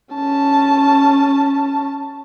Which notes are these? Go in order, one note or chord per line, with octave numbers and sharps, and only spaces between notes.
C#4 A5